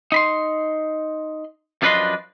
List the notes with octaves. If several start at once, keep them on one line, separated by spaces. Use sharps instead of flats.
D#4 B5 C6
F#2 F3 D4 B4 D#5 C6